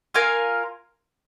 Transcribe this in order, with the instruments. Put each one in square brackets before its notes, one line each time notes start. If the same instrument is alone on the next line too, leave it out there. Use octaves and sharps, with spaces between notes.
[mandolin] F4 A#4 F5 G#5